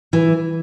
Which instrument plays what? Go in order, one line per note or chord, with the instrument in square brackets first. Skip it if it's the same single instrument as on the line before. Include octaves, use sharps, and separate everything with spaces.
[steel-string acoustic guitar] E3